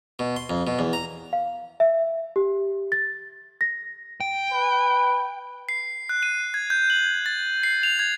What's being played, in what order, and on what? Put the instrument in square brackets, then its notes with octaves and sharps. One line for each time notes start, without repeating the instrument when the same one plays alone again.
[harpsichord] B2
C6
F2
B2
E2
A#5
[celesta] F5
E5
G4
A6
A#6
[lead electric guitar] G5
[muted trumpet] B4
[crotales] C7
F#6
D#7
G#6
G6
F#7
A6
C7
F7
G#6